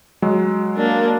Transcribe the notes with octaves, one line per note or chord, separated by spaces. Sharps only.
F#3 G#3
A#3 D4